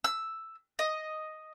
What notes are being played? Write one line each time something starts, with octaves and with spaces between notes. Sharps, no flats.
E6
D#5